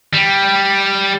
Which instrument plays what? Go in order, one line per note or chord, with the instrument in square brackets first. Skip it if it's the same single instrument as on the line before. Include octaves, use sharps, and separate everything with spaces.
[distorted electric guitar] G3